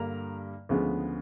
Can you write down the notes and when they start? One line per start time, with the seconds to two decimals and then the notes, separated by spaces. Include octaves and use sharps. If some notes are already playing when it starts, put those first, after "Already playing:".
Already playing: G2 D3 G3 A#3 A#5
0.69 D2 C#3 F3 G#3 B3